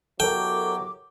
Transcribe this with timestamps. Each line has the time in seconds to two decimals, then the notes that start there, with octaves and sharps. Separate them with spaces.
0.20 B2 F#3 E4 G4 A4 A#4 G5 D6